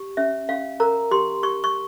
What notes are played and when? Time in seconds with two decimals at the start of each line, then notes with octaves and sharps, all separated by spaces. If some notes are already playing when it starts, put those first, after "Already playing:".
Already playing: G4
0.17 C#4 E5
0.49 C#4 F5
0.80 A#4 A#5
1.11 G4 C6
1.43 G4 C#6
1.64 C#6